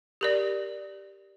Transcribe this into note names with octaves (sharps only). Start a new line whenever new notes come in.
G4 A#4 D5